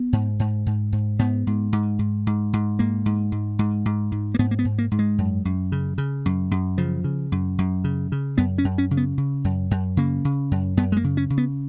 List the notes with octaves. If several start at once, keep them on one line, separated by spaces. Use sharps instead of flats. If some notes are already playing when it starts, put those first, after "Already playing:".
Already playing: B3
G#2
G#2
G#2
G#2
G#2 B3
G#2
G#2
G#2
G#2
G#2
G#2 A#3
G#2
G#2
G#2
G#2
G#2
A#3
G#2 B3
A#3
B3
G#2
A#3
G#2
G#3
F#2
F#2
C#3
C#3
F#2
F#2
C#3 F3
C#3
F#2
F#2
C#3
C#3
F#2 B3
C#4
F#2
C#4
C#3
B3
C#3
F#2
F#2
C#3 A#3
C#3
F#2
F#2 B3
G#3
A#3
C#3
C#4
C#3
B3